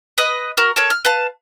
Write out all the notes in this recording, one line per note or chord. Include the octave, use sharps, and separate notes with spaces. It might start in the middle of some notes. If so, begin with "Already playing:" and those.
B4 D#5 D#6
F#4 A#4 F6
A4 A#4 C#5
F6
B4 F5 A5